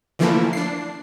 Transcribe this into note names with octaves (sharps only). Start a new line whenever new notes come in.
D3 E3 F3 A3 A#3 E4
D4 C7